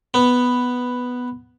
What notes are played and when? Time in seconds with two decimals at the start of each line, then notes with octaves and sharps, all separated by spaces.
0.14 B3